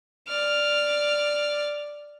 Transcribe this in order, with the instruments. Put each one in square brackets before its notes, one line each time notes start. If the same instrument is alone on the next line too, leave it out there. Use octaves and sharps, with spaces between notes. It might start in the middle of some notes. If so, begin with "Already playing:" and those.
[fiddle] D5 F6